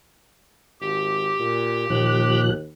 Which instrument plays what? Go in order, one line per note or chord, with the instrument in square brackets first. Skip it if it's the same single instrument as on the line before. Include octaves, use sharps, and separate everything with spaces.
[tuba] G#1 [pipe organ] G4
[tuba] A#2
[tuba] D#2 [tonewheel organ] A#2 F3 F#6